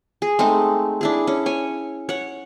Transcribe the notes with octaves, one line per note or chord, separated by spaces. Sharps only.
G#4
G#3 A3 C4 D#4
D4 E4 G#4
C#4
C#5 G#5
C#5 F#5